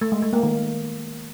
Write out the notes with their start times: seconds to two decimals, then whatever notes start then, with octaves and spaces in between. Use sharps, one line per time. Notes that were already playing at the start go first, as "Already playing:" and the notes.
0.01 A3
0.12 G#3
0.22 A3
0.33 A#3
0.43 D#3